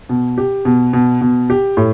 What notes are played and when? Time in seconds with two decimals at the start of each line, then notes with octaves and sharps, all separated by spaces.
0.09 B2
0.38 G4
0.65 B2
0.93 B2
1.21 B2
1.50 G4
1.77 A2